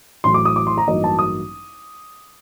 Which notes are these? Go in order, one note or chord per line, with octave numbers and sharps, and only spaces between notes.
A1 A2 F#3 C6
D6
D#6
D6
C6
A#5
A1 G2 F#3 A#3 D#4 D#5
A5
D#6